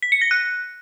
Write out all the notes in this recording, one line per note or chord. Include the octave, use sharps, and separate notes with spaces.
B6
C#7
A#6
F#6